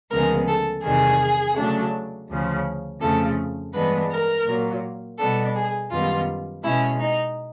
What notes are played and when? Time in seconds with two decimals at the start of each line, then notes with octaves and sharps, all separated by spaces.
0.10 D2 C#3 F3 G#3 B3 A#4
0.47 A4
0.83 E2 C3 D#3 G3 G#4
1.56 C#3 F#3 A3 D4
2.28 D2 C#3 F3
3.00 F2 C#3 F3 A3 A4
3.73 G2 E3 G#3 B3 D4 B4
4.10 A#4
4.45 A#2 F#3 A#3
5.18 B2 G3 B3 D4 A4
5.55 G#4
5.90 F#2 D#3 G3 B3 F4
6.63 B2 G#3 C#4 E4
6.99 D#4